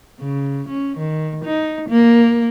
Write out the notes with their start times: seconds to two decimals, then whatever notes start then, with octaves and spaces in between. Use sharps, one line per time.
0.20 C#3
0.69 C#4
0.98 D#3
1.45 D#4
1.89 A#3